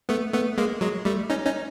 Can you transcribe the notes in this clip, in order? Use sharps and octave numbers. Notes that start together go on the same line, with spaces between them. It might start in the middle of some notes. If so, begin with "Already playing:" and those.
A3 B3
A3 B3
G#3 A#3
F#3 G#3
G3 A3
C#4 D#4
C#4 D#4